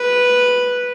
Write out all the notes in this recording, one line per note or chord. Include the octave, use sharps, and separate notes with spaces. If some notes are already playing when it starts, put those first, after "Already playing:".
Already playing: B4